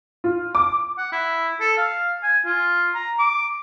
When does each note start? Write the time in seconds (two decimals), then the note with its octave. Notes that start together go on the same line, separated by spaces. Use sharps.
0.24 F4
0.55 D6
0.98 F#5
1.12 E4
1.61 A4
1.78 F5
2.23 G#5
2.46 F4
2.95 A#5
3.19 D6